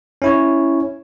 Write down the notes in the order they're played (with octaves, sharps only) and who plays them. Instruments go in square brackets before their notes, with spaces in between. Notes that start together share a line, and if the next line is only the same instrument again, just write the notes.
[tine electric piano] C#4 E4 C#5